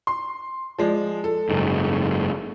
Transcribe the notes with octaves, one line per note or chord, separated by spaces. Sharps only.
C6
F3 G#3 D5
A4
F#1 G#2